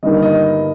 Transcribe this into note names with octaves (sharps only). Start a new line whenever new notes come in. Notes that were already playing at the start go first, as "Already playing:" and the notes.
G1 G2 D#3 G3 A#3 D#5
D#5